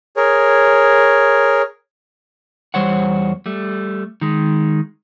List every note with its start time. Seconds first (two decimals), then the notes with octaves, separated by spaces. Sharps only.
0.17 G#4 A#4 C#5
2.74 E2 G3 C5 C#5 F#5
3.46 G3 A3
4.21 D#3 G#3